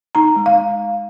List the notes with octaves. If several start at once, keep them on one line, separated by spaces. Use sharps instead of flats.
D#4 A#5
G#3
F5